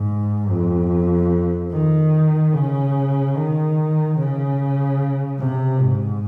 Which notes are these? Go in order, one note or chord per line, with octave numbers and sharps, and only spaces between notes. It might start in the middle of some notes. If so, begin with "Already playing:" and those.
Already playing: G#2
F2
D#3
C#3
D#3
C#3
C3
G#2